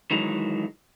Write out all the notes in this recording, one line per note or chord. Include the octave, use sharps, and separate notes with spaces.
D#3 E3 F#3 G#3